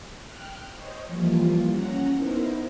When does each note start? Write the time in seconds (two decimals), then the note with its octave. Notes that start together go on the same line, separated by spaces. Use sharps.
0.24 G5 F6 F#6
0.72 C5 C#5 D#5
1.07 E3 F3 G3 A#3 F4
1.68 C#4 F#5 A#5
2.15 B3 D#4 E4 A#4 C5